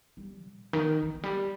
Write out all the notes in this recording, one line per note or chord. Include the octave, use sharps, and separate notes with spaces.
G3
A#2
D#3
E3
E3
G3